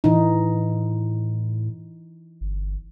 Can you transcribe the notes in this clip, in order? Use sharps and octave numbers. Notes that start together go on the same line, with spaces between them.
A2 E3 D#4
G1